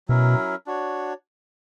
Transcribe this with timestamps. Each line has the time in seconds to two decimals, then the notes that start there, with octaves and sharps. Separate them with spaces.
0.08 B2 F#3 C#4 E4 A#4
0.67 D4 F#4 C#5